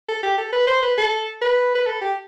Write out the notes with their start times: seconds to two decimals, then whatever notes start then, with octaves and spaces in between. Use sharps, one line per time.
0.08 A4
0.23 G4
0.38 A4
0.52 B4
0.67 C5
0.82 B4
0.98 A4
1.42 B4
1.75 B4
1.86 A4
2.01 G4